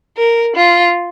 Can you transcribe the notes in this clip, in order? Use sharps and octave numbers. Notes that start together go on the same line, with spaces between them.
A#4
F4